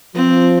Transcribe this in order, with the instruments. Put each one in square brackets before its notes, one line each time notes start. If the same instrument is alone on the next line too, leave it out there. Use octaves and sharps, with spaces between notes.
[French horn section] F3 [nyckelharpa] C4